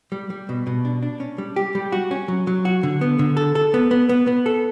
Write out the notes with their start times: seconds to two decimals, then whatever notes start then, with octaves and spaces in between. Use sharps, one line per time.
0.12 G3
0.30 G3
0.49 B2
0.67 B2
0.85 D4
1.03 D4
1.20 C#4
1.38 G3
1.56 G4
1.75 G3
1.92 F#4
2.11 C#4
2.28 F#3
2.47 F#3
2.65 F#4
2.83 D3
3.01 B3
3.19 D3
3.37 A4
3.55 A4
3.74 B3
3.91 B3
4.09 B3
4.27 B3
4.46 A4